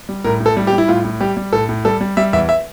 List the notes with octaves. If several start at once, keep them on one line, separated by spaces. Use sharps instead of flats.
G3
A2 A#4
A2
A4
G3
G4
G3
E4
A2 F4
A2
G3 G4
G3
A2 A4
A2
G3 A4
G3
G3 E5
E2 E5
E5